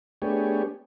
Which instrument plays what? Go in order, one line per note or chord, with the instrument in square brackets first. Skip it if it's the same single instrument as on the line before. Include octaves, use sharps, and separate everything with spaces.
[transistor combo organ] A3 B3 D4 G4 G#4 C#5